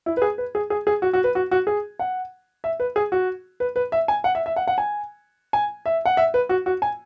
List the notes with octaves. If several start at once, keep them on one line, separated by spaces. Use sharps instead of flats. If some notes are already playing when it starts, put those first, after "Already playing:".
E4
B4
G#4
B4
G#4
G#4
G#4
F#4
F#4
B4
F#4
F#4
G#4
F#5
E5
B4
G#4
F#4
B4
B4
E5
G#5
F#5
E5
E5
F#5
F#5
G#5
G#5
E5
F#5
E5
B4
F#4
F#4
G#5